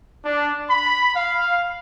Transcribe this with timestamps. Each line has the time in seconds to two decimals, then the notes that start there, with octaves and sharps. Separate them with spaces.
0.24 D4
0.69 B5
1.16 F5